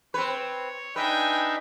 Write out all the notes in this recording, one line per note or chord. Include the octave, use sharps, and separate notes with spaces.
C4 B4 C#5
D4 D#4 B4 E5 G5 G#5